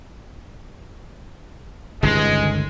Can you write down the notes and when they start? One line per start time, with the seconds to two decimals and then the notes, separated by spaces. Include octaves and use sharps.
2.03 G1 C#2 D#3 G#3